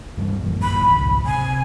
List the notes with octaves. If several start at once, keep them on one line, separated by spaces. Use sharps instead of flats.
G2 E3 G3
A1 F#2 A#2
B5
G#1 C#2
C3 G#5